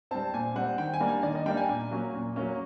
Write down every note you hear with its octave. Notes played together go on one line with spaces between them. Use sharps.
G3 C4 A5
A#2 G#5
G3 C4 F#5
D#3 G5
G#5
G3 A#3 D4
G#5
D#3 D5
D#5
G3 A#3 D4 G5
G#5
A#2
F#3 A#3 C#4
A#2
F#3 A#3 C#4